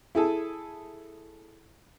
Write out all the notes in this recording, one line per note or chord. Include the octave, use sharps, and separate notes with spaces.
E4 G#4 A4